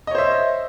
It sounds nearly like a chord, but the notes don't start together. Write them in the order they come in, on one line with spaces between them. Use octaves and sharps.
D#5 C#5 C5 E5